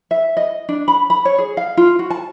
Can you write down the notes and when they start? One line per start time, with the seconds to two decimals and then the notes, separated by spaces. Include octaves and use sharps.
0.11 E5
0.37 D#5
0.69 D4
0.88 B5
1.10 B5
1.25 C#5
1.38 G#4
1.57 F5
1.77 F4
1.99 F#4
2.10 A5